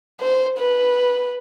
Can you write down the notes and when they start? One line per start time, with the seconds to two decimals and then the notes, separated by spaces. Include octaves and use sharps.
0.20 C5
0.58 B4